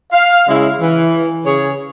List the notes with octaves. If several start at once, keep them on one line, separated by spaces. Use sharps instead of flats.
F5
C#3 G#3 E4
E3
C#3 G#4 C#5